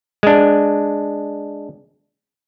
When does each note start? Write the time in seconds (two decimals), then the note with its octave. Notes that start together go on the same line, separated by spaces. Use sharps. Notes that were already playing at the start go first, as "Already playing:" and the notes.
0.23 G#3 D4